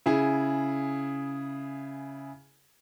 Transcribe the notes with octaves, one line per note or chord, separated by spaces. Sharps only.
C#3 E4 G#4